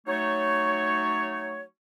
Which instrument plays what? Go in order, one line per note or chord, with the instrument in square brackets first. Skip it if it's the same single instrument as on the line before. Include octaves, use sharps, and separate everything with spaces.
[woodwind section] F#3 A3 D#4 C#5